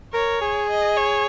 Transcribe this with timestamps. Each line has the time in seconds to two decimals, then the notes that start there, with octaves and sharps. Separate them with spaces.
0.14 A#4 C#5
0.41 G#4
0.70 D#5
0.97 C#5